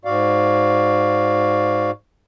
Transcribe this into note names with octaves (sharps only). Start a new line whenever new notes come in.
G#2 F#4 D5 F5